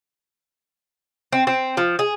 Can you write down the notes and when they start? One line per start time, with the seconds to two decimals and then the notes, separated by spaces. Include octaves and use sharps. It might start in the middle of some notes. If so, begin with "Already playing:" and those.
1.33 C4
1.47 C4
1.77 F3
1.99 G#4